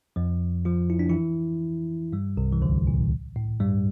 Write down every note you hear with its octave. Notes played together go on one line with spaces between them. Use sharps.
F2 F3
F3 F4
E4
D4
E3 E4
G2 G3
C2 C3
E3
D2 D3
A#2
A2
G2 G3